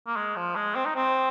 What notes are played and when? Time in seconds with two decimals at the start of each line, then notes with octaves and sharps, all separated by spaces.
0.07 A#3
0.17 G#3
0.36 F3
0.56 G#3
0.76 C4
0.86 D#4
0.96 C4